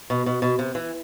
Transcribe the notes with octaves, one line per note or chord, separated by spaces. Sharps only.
B2
B2
B2
C3
E3